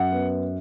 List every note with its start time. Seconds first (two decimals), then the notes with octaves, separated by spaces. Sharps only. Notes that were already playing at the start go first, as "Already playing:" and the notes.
Already playing: F#2 F#5
0.12 B3